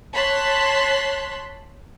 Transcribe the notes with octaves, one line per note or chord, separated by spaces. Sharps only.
C#5 A5 C6 F#6 B6